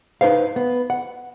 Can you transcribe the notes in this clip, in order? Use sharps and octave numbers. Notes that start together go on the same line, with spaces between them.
D#4 B4 C5 F5
B3
F#5